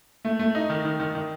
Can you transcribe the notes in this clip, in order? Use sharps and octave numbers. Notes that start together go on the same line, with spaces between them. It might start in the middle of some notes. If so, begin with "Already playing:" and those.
A3
A3
D#4
D#3
D#3
D#3
D#3